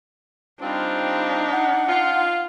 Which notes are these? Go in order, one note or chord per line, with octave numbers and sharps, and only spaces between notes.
G3 C4 D4 D#4 F4
F#5
F4